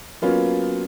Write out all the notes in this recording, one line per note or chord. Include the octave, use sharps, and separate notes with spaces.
F#3 A#3 B3 C#4 F4